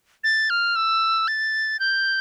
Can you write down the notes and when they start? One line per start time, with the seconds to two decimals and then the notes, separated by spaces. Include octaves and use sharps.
0.24 A6
0.50 F6
0.76 E6
1.28 A6
1.80 G6